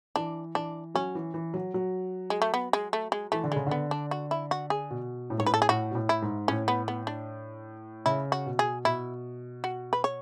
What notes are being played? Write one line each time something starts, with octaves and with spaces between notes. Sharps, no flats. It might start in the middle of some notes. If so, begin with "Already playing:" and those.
E3 D4
E3 D4
F#3 C#4
E3
E3
F#3
F#3
G#3
A3
B3
G#3
A3
G#3
E3 A3
D3
C#3 G#3
D3 B3
D4
F#4
E4
F#4
G#4
B2
A2
G#2 C#5
A2 B4
A4
G#4
A2 F#4
B2
A2
E4
G#2
A2 C#4
B3
B3
D4
C#3 E4
F#4
B2
G#4
B2 E4
F#4
B4
C#5